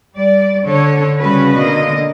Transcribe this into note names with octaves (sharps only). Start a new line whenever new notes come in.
G3 D5
D3 A4 C#5
C#3 G3 C#4 F#4 B4 C#5
B2 D3 A#3 D#5